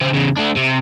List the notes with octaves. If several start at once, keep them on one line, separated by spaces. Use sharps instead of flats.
C#3 C4
E2 C#3
A3 D4
C3